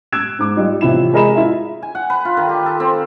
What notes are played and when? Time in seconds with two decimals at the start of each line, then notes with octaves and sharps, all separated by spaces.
0.12 E6 F#6 G#6 D7 E7
0.39 G#2 D6
0.56 G3 D#4 F4
0.81 A1 C3 F3 E4 E7
1.13 G#3 G#4 A#4 D#5 B5 E7
1.36 E4 F4 E5
1.83 G#5
1.95 F#5
2.10 B4
2.25 F4
2.37 D#3
2.49 G4
2.66 A4
2.80 C4